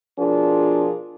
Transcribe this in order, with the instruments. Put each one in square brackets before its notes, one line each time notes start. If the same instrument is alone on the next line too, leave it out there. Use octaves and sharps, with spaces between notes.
[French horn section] B2 F3 D4 F4 G#4 A#4